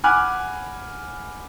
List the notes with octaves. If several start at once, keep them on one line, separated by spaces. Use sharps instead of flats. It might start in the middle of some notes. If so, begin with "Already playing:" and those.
F#5 G#5 B5 D6 F6 F#6